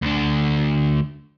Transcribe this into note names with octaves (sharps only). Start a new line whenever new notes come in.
D2 D4